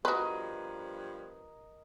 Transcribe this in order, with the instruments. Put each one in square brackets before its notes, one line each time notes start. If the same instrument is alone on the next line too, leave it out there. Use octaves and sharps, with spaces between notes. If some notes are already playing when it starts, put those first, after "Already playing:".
[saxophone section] G2 F3 B3 [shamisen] F#4 B4 [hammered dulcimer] A#4 D#5